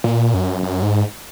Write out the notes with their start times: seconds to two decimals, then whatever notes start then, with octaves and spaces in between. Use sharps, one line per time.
0.04 A#2
0.34 F#2
0.63 F#2
0.82 G#2